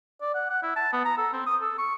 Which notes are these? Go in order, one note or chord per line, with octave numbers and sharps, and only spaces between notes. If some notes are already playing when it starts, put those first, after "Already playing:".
D5
F#5
F#5
E4
A5
B3
A#5
A4
C4
D#6
A4
C#6